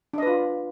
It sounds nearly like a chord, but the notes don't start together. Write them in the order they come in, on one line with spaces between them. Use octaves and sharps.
D4 D#5 B4 F4